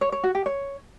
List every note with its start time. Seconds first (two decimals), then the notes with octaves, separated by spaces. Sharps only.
0.01 C#5
0.12 C#5
0.23 F#4
0.35 G4
0.46 C#5